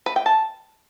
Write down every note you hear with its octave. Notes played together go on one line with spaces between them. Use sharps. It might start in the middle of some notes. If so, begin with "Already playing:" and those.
B4
G5
A5